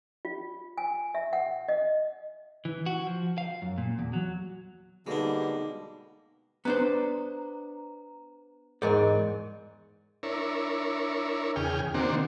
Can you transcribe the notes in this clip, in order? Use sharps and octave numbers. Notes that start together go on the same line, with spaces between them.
F4
G#5
E5
F#5
D#5
E3
F#4
F3
F5
F#2
A#2
E2
F#3
B2 D3 G3 G#3 A#3 D4 D#4
B3 D4 C5 A#5
E2 G#2 G#4 A#4 D5 D#5
D4 E4 A#4 C#5
E2 C#3 G#4 G5 F6
C3 D#3 A#3 C4 D4 F#4